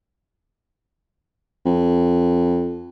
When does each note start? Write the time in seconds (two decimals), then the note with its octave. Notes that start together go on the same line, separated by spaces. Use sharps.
1.66 F2